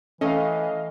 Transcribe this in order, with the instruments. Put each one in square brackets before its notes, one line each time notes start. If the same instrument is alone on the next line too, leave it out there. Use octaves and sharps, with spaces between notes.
[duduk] E3 [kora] A3 A4 [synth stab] C#4 [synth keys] D#5 F5